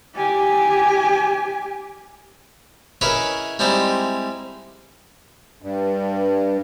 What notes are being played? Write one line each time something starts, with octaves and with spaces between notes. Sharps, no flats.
G4 G#5
C#4 E4 G#4 A#4 B4 D#5
G3 G#3 C4 D#4 E4
G2